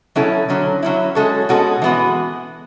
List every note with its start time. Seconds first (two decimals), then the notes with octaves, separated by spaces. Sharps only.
0.16 B2 F#3 C#4 E4 A4
0.49 D3 F#3 C#4
0.83 F#3 C#4 E4
1.15 G#3 C#4 F#4 A4 C#5
1.49 B2 G#3 C#4 F#4 A4
1.82 E3 G#3 B3 F#4